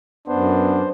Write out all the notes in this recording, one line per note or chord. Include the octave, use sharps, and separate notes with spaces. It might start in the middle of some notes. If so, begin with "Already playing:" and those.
F#2 B3 D4 C5